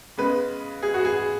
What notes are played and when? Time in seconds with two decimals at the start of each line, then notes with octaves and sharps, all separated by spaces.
0.18 C#3 G#3 B3 B4
0.83 G#4
0.94 F#4
1.05 G#4